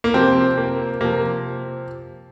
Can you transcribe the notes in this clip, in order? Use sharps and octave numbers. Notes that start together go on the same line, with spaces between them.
A#3
C3 F3 C4
A#3
C3 F3 A#3